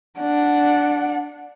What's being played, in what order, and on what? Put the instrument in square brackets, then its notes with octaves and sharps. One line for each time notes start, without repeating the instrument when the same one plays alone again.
[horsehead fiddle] D4 F#5